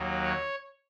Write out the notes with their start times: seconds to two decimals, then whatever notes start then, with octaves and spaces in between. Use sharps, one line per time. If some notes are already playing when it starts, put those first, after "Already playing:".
Already playing: D#2 D#3 F#3
0.23 C#5